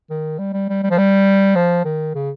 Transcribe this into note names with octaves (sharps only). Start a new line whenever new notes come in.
D#3
G3
G3
G3
G3
F3
G3
F3
D#3
C#3